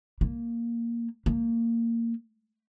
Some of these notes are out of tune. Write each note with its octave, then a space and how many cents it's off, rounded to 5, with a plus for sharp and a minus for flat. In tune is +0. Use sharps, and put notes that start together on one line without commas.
A#3 +0
A#3 -15